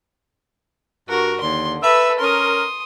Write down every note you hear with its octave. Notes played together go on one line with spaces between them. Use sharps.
G2 F#4 A#4
D#2 D3 C6
A4 B4 E5
C#4 A#4 C6 D#6